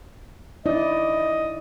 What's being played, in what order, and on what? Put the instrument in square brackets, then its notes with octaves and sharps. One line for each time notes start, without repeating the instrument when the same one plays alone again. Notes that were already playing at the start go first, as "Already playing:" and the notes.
[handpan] D#4 E4 D5 [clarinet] D#5